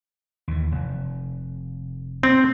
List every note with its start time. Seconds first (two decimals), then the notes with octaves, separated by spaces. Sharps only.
0.48 D#2 E3
0.72 F1
2.23 C4